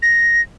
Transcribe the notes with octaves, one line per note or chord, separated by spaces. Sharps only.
A#6